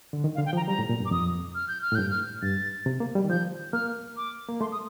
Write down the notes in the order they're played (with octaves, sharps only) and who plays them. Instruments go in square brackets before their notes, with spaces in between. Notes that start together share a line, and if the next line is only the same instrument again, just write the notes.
[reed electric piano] D3
D#3
[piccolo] F5
[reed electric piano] D3
[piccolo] G5
[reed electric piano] F3
[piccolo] A#5
[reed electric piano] G3 [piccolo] A#5
[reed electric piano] A2
A#2
G2
[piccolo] D6
[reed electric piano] F2 [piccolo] D#6
[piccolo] F6
G6
F6
[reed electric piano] A2
[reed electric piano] G2 [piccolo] G6
[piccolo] F6
[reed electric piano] G2 [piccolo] A6
[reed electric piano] C3
A#3
G3
D#3
[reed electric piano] F3 [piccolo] G6
[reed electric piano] A#3 [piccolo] F6
[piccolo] D6
[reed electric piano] A#3
[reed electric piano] A3 [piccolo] C6
[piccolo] D#6